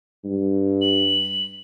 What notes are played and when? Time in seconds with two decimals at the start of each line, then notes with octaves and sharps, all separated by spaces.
0.24 G2
0.81 F#7